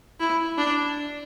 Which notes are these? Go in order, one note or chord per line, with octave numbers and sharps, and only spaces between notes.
E4
D4